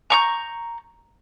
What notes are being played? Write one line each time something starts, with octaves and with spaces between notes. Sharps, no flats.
A#5 C#6 G6